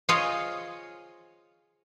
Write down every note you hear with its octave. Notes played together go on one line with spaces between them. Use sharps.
F4 G#4 C5 C#5 D#5